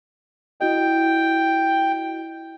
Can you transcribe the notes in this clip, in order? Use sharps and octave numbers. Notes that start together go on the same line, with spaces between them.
E4 F#4 D#5 G5